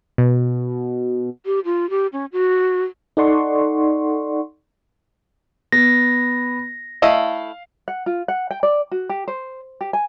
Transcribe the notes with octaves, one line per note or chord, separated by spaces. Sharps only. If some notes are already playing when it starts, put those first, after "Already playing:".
B2
G4
F4
G4
C#4
F#4
D#4 A4 D5 F#5 C6 C#6
B3 A#6
A3 E4 D#5 F5
F#5
F4
F#5
G5
D5
F#4
G4
C5
G4
G#5